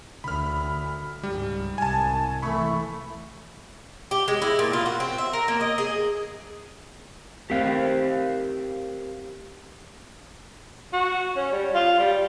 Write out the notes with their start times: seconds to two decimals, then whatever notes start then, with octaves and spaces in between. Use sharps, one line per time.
0.24 D2 B5 F6
1.23 C#2 G#2 G3
1.78 C2 G#5 A5
2.42 E3 A3 B5 C#6
4.11 G4
4.28 G#3
4.42 E4
4.59 A#2
4.73 F4
4.86 F#4
5.00 C4
5.18 E5
5.33 A#4
5.48 A#3
5.61 D#5
5.78 G#4
7.50 A3 C4 G4 A#4 F5
10.93 F#4
11.37 C#4
11.52 G3
11.74 F4
11.99 G3